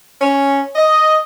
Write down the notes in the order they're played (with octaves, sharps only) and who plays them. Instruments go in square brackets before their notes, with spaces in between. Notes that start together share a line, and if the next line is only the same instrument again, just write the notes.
[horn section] C#4
D#5